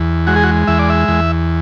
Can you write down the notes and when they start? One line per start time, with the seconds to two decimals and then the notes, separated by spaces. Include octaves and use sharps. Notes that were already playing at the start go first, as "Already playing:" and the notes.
Already playing: E2
0.27 G#3 F#4
0.36 G#4
0.43 F#4
0.67 E2 E5
0.79 D5
0.90 E5
1.08 E2